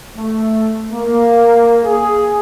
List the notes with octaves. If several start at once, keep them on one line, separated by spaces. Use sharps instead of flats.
A3
A#3
G#4